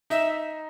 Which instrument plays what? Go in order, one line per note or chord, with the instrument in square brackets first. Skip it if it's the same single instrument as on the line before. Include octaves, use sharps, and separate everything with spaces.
[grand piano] D#4 [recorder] E5